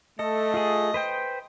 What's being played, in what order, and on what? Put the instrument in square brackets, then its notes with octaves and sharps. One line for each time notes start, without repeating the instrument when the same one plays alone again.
[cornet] A3 [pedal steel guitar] A4 [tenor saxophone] D#5
[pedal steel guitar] F4 G#4
B4 C5 G5